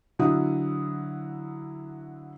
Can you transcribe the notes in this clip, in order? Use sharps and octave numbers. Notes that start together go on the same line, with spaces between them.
D3 F#3 E4 D#6